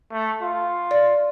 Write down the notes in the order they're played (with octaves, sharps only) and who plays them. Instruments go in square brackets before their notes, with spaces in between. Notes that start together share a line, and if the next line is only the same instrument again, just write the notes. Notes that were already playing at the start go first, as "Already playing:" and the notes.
[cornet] A3
F4
[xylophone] D5